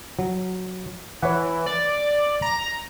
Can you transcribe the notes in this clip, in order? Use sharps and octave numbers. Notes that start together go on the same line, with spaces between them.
F#3
E3 C#5 F#5
D5
A#5